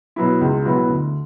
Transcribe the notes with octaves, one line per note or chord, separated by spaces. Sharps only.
B2 F#3 B3 E4
C#2
B2 F#3 B3 E4
D2